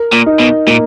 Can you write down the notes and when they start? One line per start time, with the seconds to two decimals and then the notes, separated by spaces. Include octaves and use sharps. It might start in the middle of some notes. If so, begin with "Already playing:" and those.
Already playing: A#4
0.13 A#2
0.26 D#4
0.39 B2
0.67 A#2 A#3